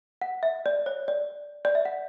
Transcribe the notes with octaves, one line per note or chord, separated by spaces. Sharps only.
F#5
E5
D5
C#5
D5
D5
E5
F#5